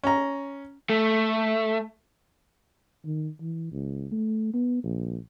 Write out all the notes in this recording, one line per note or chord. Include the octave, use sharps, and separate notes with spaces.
C#4 A#5
A3
D#3
E3
C#2
A3
B3
A#1